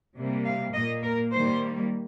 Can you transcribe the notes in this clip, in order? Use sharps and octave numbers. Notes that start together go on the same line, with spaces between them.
C3 G3 A#3
F5
A#2 A#3 D#5
A#4
D#3 G3 A#3 C5